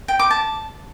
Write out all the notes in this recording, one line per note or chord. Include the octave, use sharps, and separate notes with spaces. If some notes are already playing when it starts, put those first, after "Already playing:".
G5
D6
A5